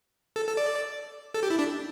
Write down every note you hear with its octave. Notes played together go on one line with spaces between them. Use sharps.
A4
A4
D5
A4
G4
E4
D4